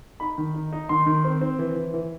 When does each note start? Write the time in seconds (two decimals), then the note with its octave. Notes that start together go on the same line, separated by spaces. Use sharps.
0.20 D#4 B5
0.38 D#3
0.54 D#4
0.73 D#4
0.89 D#3 C6
1.07 D#3
1.25 C4
1.41 C4
1.59 E3
1.76 E3
1.94 E3